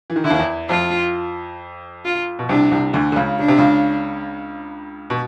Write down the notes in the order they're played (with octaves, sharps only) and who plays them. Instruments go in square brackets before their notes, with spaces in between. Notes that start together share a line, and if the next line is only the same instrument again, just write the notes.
[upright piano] E3
D#3
[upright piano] D3 [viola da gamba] E4
[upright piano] D#2 D#3
E2 E3
[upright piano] F2 F3 [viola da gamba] F4
[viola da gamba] F4
[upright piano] B2
[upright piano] C2 C3 [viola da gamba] D4
[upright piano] C2 C3
D2 D3
D3
C#2 C#3
[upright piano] C#3 [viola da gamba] D4
[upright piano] C3
C#2 C#3
B2